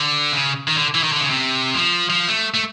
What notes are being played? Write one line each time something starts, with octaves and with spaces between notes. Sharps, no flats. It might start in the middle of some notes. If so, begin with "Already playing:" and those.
Already playing: D3
C#3
D#3
D3
E3
D#3
D3
C#3
C3
F3
F3
A3
A3